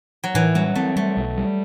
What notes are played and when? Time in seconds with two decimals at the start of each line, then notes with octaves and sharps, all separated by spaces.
0.24 F#3
0.34 A2 E3
0.55 F#3 G3
0.76 A3 C4
0.96 G3 A3
1.17 B1
1.37 G3